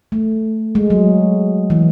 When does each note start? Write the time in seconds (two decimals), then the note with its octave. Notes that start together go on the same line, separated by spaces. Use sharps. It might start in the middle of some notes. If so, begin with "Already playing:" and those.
0.12 A3
0.75 G#3
0.90 F#3
1.70 E3